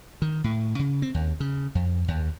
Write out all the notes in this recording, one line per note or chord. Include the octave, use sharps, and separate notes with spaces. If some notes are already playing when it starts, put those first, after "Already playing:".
D#3
A2
C#3
C4
D#2
C#3
F2
D#2